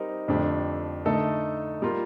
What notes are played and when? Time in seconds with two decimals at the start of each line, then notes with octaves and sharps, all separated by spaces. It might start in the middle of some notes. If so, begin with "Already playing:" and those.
Already playing: G3 C4 D#4 A#4
0.28 F2 D3 A3 D4 G4
1.05 D3 A3 D#4 A4
1.82 G3 A#3 F4 A#4